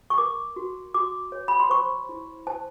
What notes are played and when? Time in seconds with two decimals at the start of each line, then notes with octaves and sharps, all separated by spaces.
0.10 C#6
0.18 A#4 D6
0.56 F#4
0.94 F#4 D6
1.32 C#5
1.48 B5
1.60 C6
1.70 C5 C#6
2.09 E4
2.47 C5 A5